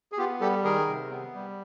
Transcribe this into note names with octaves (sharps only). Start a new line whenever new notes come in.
G#4
B3 F4 G4
G3 G4 A4
D#3 G#4 A#4
C3
B3
G3